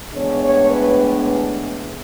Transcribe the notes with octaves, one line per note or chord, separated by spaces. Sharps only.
A2 E3 G#3 B3 D4 C#5
C#5
B4